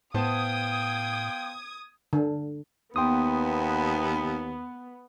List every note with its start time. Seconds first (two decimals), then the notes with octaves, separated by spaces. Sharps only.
0.14 A2 B3 C5 F5 G5 A5 D#6 G#6
2.13 D3
2.96 D#2 B3 G5 C6 D#6